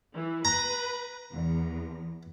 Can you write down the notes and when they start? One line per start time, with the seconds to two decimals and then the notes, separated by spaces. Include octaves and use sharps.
0.13 E3
0.45 B4 A#5
1.31 E2